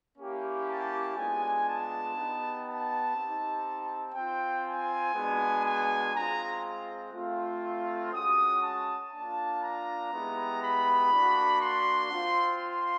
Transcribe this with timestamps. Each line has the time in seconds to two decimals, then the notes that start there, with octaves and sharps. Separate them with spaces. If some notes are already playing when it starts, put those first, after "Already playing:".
0.17 A#3 C#4 E4 G4
0.67 A5
1.17 G#3 B3 D4 F4 G#5
1.66 A5
2.16 B3 D#4 G4
2.66 A5
3.16 C4 D#4 G4
4.15 C4 F4 G5
4.64 G#5
5.15 G#3 B3 D4 F#4
5.64 G#5
6.13 G#3 C4 F4 A#5
7.13 A3 C4 F4
8.12 G#3 C#4 F#4 D#6
8.62 A5
9.12 A#3 D4 F4 A5
9.62 A#5
10.11 G#3 B3 E4 G4
10.61 B5
11.11 A#3 D4 F#4
11.60 C6
12.10 C4 F4
12.60 C6